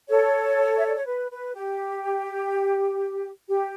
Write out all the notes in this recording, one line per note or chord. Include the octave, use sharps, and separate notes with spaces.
A4 C#5
E5
D5
C#5
B4
B4
G4
G4